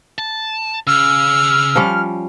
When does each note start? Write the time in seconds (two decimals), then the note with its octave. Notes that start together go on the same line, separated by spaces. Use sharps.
0.18 A5
0.87 C#3 E6 F6
1.76 F3 G3 C#4